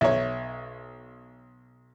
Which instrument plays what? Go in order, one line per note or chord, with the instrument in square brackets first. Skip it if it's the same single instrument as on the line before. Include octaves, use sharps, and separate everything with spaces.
[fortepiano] B1 C#5 [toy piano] E5